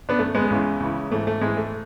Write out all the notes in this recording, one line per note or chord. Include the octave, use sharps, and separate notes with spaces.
B3 D4
F#2 D3 A3
G#3 B3
C#2 C#3 E3
C#2 C#3 E3
G#2 E3 A3
A3
G#2 E3 G#3
A3